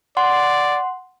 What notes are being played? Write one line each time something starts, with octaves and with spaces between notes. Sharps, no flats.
D5 F#5 C6